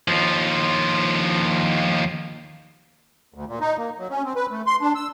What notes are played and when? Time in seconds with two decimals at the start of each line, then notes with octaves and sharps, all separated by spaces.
0.08 D#2 F3
3.34 D2
3.47 A#2
3.61 D#4
3.77 A#3
3.99 F#3
4.10 C#4
4.24 C4
4.36 B4
4.51 A3
4.67 C6
4.81 D4
4.95 E6